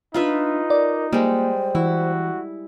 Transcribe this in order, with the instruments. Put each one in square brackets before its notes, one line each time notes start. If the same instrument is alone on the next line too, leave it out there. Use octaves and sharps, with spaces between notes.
[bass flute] D4 [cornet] D#4 [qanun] F4 B4 E5
[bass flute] A#4 [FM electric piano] D5
[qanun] G3 G#3 [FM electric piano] A#3 [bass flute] C5
[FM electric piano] E3 [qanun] E4 [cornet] F#4